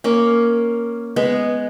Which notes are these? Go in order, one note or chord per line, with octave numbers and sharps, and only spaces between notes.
A#3 C#4
G#3 B3